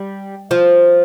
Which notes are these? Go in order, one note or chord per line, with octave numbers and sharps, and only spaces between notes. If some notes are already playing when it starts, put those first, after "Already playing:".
Already playing: G3
F3